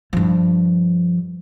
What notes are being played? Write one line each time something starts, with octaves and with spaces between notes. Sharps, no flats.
G2 F3